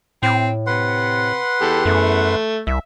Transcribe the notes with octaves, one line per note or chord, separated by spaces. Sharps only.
A2 C4
C3 B4 F#5 C6
E2 G4 A4
F#2 A3
C2 E5